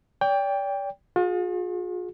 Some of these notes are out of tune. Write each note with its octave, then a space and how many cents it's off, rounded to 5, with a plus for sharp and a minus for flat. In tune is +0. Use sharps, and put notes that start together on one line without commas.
D5 -40 G5 +15
F4 +45 G#4 +0